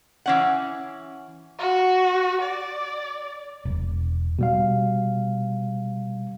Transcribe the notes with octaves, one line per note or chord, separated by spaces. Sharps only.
E3 C#4 F#5
F#4
D5
E1
B2 G3 F5